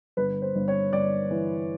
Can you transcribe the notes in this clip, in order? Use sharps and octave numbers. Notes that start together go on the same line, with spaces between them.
G1 B4
C5
G1
C#5
G1 D5
E3